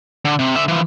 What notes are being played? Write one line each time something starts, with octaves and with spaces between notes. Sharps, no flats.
D3
C3
D3 E5
E3 F3